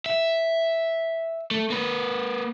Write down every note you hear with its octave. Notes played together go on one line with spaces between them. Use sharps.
E5
A3
A#3 B4